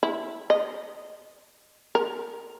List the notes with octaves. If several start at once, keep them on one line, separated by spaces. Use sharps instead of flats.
E4
D#5
A#4